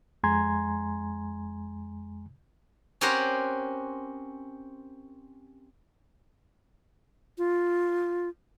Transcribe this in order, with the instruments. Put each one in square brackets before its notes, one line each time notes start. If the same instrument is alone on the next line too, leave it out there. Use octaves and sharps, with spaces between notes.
[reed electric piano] F2 G#3 G#5 A#5 C6 G#6
[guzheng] C4 C#4 G4 A#4 C5 F#5
[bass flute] F4